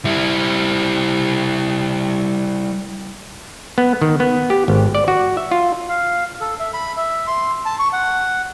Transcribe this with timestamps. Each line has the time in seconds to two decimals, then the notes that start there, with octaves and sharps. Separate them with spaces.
0.05 G3 E4
3.78 B3
4.02 D#3
4.20 B3
4.50 G4
4.68 G#1
4.95 D5
5.08 F#4
5.37 E5
5.51 F4
5.89 F5
6.41 A4
6.59 E5
6.74 B5
6.97 E5
7.27 C6
7.65 A5
7.79 C#6
7.93 F#5